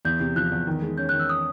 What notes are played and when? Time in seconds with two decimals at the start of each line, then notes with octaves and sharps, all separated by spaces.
0.05 E2 G6
0.20 C3
0.36 F3 F#6
0.52 E2
0.67 D#3
0.82 G#3
0.98 C#4 G6
1.09 F#6
1.14 D#3
1.19 E6
1.29 D#6